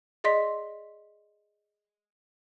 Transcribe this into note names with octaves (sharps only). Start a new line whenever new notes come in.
G#4 D5 D#5 C6 B6